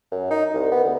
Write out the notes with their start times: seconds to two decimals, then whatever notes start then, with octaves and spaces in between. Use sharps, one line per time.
0.11 F#2
0.30 D#4
0.54 C2
0.72 B3
0.84 D2